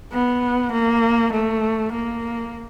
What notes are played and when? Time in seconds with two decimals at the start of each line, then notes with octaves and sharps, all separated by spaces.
0.12 B3
0.72 A#3
1.33 A3
1.93 A#3